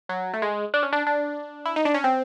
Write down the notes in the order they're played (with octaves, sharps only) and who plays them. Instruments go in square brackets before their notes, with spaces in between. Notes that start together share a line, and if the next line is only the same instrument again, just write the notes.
[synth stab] F#3
A3
G#3
D4
C#4
D4
D4
E4
D#4
D4
C#4
C4